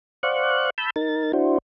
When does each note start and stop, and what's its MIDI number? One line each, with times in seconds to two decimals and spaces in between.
0.23 0.70 72
0.23 0.70 74
0.23 0.70 77
0.23 0.70 78
0.23 0.70 85
0.23 0.70 90
0.78 0.90 81
0.78 0.90 83
0.78 0.90 88
0.78 0.90 91
0.96 1.32 63
0.96 1.32 70
0.96 1.32 93
1.33 1.58 62
1.33 1.58 64
1.33 1.58 66
1.33 1.58 72